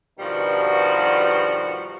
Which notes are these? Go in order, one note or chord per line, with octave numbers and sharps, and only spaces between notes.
G2 B2 D#3 F3 G3 F#4